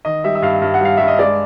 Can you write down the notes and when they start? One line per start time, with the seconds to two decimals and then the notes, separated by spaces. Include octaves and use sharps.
0.05 D#3 D#5
0.24 G3 E5
0.35 E5
0.42 G2 F5
0.62 G2
0.74 F#5
0.81 G3 F5
0.97 G2 E5
1.08 D#5
1.19 G#3 D5